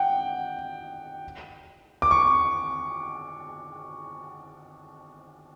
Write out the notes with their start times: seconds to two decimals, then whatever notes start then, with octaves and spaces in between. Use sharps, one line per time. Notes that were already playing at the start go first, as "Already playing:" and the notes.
Already playing: F#5 G5
2.02 D6
2.11 C#6